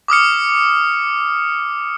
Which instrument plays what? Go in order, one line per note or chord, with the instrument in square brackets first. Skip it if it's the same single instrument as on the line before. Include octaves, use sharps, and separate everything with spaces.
[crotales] D6 D#6 F6 C#7